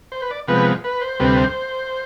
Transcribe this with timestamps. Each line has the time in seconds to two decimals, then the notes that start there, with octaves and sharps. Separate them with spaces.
0.12 C5
0.22 B4
0.31 D5
0.48 C3 F3 G#3 B3 B4
0.84 B4
1.01 C5
1.20 D2 C3 G3 C4 B4
1.38 C5